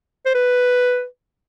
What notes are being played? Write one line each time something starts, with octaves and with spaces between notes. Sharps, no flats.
C5
B4